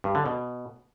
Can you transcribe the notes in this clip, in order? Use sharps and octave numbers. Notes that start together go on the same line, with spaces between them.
G2
D3
B2